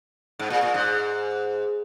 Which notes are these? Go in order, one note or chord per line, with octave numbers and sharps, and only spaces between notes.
G#2
A#2
A#2
G#2